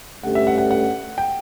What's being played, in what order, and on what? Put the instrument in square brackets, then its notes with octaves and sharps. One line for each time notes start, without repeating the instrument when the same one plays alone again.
[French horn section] G2 D3 A3 C#4 G4 [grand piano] F#5
[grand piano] E5
F#5
F#5
F#5
G5